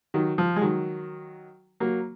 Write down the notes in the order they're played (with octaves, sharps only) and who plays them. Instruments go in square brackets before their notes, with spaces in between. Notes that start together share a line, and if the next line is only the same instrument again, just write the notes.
[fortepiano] D#3 F#3
F3
G#3
D#3 F#3
F#3 A#3